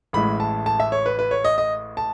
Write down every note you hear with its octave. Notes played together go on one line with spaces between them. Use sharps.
A1 A2 G#3 B5
A5
A5
E5
C#5
B4
B4
C#5
D#5
D#5
A5